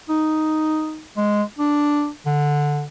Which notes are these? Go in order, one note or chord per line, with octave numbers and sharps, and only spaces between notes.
D#4
G#3
D4
D3